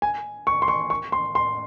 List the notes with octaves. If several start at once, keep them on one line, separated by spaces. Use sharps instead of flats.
G#5
C#6
C6
C#6
C#6
C6
C6